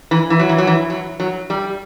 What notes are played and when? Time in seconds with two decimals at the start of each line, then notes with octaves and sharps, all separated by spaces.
0.11 E3
0.30 E3
0.39 F#3
0.49 E3
0.58 F#3
0.67 E3
0.90 F#3
1.20 F#3
1.50 G3